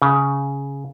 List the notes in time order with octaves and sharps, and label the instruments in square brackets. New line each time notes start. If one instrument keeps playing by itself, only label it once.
[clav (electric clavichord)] C#3